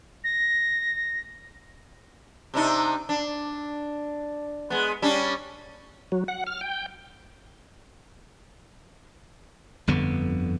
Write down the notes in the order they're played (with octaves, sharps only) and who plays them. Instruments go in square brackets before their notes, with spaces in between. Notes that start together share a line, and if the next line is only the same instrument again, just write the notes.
[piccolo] A#6
[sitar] C3 D4 D#4
D4
G#3 B3
G3 C#4 D4
[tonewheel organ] F#3
F#5
F6
G5
[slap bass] G1 F2 D3 B3